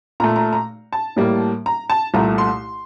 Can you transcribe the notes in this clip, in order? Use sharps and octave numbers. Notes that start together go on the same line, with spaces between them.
A#2 A3 A#5
A#5
A#5
A5
A2 G3 A#3
A#5
A5
C2 A#2 A3 A#5
C6